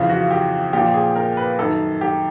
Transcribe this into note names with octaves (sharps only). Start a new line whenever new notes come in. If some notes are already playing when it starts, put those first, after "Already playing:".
Already playing: F2 C#3 E3 F4
F#4
G4
A#2 F3 G4
G#4
A#4
B4
F#2 D#3 A4
G4